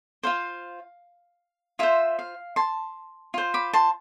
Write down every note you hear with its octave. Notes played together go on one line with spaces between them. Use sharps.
F4 C5 F5
F4 C5 E5
F5
A5 C6
F4 C5
B5 D6
A5 C6